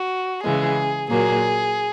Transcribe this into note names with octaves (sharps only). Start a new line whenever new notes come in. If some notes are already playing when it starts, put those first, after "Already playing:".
Already playing: F#4
C#3 E3 G#3 G#4
A#2 F#3 A#3 G#4